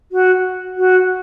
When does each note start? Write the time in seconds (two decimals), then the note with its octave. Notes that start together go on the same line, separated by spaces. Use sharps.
0.12 F#4
0.77 F#4